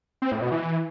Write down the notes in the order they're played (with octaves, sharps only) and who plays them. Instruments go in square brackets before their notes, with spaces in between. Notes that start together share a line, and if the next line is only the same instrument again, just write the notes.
[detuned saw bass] C4
A2
B2
E3